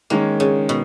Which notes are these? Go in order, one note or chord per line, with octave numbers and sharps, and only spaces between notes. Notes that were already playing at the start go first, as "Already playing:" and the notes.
D#3 G#3 A#3 C#4
C#3
B2